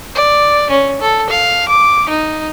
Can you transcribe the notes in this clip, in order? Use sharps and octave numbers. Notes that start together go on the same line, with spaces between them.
D5
C#4
A4
F5
D6
D#4